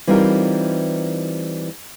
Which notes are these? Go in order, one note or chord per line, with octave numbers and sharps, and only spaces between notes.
E3 G3 C4 D#4 F4 A#4